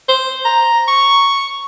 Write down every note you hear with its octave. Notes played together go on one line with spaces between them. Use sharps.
C5
A#5
C#6